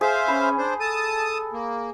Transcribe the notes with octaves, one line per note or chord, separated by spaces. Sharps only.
G#4 C5 E5 F5
C#4 B4
D4 C5
A4 A5 D#6
A#3